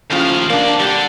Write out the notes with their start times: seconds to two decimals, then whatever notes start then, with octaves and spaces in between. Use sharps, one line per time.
0.10 D#2 A2 C#3 F3 F5
0.50 C3 A#3 D4 D5
0.80 D3 G3